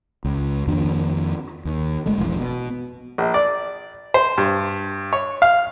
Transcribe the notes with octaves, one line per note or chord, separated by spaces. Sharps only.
C#2
F2 D#3 A#3 D4
D#2
G1 G#3 A3
F1 A#1 E3
B2
A#1
D5
C5
G2
C#5
F5